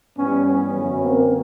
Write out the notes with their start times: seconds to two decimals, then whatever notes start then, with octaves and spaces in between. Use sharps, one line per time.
0.18 G2 E3 G3 B3 C#4
0.46 B3 C#4
0.73 F#2 D3 F#3
1.01 A#3 C4